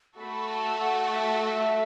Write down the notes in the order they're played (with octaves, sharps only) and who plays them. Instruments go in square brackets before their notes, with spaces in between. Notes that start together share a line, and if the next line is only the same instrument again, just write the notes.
[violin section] A3 F#4 A4 [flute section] B5
[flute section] A5
F#5
E5
E5